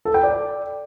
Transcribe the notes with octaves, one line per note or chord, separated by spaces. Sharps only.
A4
G5
D5